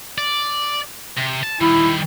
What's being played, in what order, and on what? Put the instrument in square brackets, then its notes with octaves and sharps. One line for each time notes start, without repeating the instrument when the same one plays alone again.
[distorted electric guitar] D5
C3
A5
[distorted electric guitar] D#3 G3 [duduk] E4